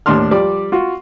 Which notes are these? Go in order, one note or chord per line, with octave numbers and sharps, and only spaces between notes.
D#2 A2 D4 C6 F6
F3 G3 D5 D6
F4 F#4